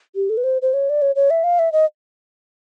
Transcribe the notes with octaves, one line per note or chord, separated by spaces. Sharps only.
G4
A4
B4
C5
C5
C#5
D5
C#5
C#5
E5
F5
E5
D#5